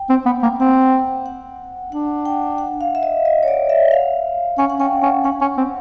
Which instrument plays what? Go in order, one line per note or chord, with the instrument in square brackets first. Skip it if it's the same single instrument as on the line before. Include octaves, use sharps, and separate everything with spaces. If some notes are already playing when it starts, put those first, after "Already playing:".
Already playing: [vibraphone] G5
[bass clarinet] C4
B3
A#3
[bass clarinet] C4 [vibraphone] F#5
[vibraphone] G5
G5
F#5
[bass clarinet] D4 [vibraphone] F#5
[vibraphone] G5
F#5
F5
E5
D#5
D#5
C#5
D5
E5
F5
[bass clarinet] C#4 [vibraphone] F#5
[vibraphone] F#5
[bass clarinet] C#4 [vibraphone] G5
[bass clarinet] C#4 [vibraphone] F#5
[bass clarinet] C#4 [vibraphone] F#5
[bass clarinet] C#4
C4